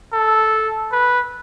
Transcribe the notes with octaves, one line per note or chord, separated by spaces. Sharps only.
A4
B4